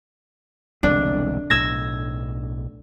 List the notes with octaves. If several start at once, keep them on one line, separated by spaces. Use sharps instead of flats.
E1 C2 D3 D4
B1 A2 E6 G#6 A#6